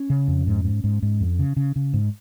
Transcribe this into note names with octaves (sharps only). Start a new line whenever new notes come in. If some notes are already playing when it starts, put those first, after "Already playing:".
Already playing: C#4
C#3
F2
G#2
G#2
G#2
G#2
F2
C#3
C#3
C#3
G#2